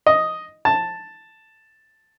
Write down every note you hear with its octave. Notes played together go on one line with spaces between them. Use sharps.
D#5
A5